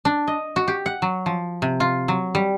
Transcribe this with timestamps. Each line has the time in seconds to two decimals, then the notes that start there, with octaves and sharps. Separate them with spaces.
0.05 D4
0.27 D#5
0.56 F#4
0.68 G4
0.86 F#5
1.02 F#3
1.26 F3
1.62 C3
1.80 F4
2.08 F#3
2.35 G3